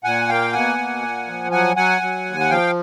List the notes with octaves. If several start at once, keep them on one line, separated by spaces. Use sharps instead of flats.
A#2 F#5 G#5
A#3 F5 G5
B2 F#5 G#5
A#3
A#2
F3
F#3 F#5 G#5
F#3 F#5 G#5
F#3
D#2
F#5
F3 F5 G5